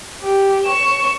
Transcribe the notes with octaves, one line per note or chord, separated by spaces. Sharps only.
G4
C#6 E7